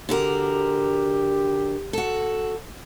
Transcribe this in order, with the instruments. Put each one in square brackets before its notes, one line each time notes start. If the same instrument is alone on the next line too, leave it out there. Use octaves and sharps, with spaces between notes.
[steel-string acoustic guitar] D3 F#4 A#4 [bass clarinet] G4
[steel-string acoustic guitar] F#4 A4